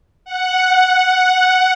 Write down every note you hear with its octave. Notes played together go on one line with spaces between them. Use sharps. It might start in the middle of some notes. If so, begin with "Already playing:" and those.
F#5
F#5